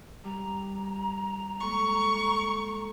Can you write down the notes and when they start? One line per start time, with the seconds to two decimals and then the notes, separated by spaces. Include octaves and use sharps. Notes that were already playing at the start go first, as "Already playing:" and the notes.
0.24 G3 A#5
1.60 G#3 A#3 A4 C#6